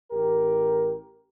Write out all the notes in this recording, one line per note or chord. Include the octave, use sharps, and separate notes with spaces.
A1 G4 A#4